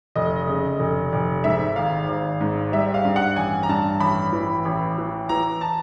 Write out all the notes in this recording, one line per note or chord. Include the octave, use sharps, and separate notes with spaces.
F1 D#5
C#3
F1
F1
G#2 E5
G#1 F5
G#1
G#2
G3 E5
F5
G2
F#5
A1 G#5
A#5
G2 A5
A1 B5
E3
A1
E3
E3 A#5
A5